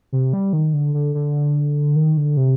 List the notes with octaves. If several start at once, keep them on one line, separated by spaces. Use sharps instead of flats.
C3
G3
D#3
D3
D3
D3
D#3
D3
C3